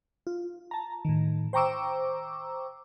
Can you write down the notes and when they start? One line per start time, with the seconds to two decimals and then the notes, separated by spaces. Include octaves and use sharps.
0.27 F4
0.71 A5 A#5
1.05 A2 D#3
1.53 C5 G5 A#5 C#6 D6 E6